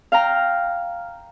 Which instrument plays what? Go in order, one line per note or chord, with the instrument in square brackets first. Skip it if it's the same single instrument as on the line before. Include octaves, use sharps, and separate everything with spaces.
[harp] F5 G5 A#5